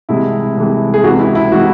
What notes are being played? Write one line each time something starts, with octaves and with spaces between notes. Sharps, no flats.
C2 C3 E3 G#3 E4
C2 C3 E3 G#3
G#4
C#2 C3 E3 G#3 F#4
E4
E4
C3 E3 G#3 F#4